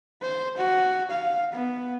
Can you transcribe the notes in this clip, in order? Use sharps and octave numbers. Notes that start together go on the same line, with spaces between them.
C5
F#4
F5
B3